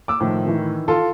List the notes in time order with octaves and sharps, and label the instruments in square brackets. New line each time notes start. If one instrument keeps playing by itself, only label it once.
[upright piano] D6 E6
[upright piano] A2 [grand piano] D#3 F3
[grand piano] D#3 E3
[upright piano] F4 A4 C6